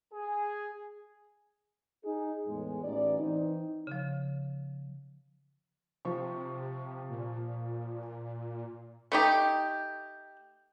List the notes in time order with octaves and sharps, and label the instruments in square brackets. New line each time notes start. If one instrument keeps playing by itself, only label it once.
[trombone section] G#4
[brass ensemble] D#4 G#4
E2 A2 G#3
A1 A2 E3 D#4 D5
E3 C4 D#4
[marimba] C#3 F3
[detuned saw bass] C3 [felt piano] F3 C#6
[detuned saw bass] A#2
[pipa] A3 D#4 G4